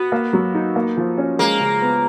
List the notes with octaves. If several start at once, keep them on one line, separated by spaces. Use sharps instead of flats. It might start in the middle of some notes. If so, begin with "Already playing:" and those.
Already playing: B3 F#4
A#3
F#3
D#4
A#3
F3
C#4
G#3 A#3
C#3
B3